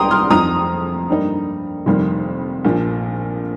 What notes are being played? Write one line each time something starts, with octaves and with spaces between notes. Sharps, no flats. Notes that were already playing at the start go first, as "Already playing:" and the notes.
Already playing: C2 G5 A#5 C6 D#6
C6 F6
F2 F3 D#4 A#5 D#6
G2 G3 A#3 D#4
F1 F2 D#3 G3 A#3
A#1 A#2 F3